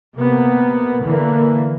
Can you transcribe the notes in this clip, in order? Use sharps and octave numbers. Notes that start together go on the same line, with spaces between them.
C3 A#3 B3
D3 E3 A#3